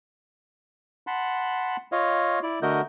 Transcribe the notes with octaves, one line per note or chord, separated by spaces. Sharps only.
F#5 A5 B5 C6
F4 C#5 D#5 F5
E4 D5
D3 A3 F#4 A#4 D#5 G6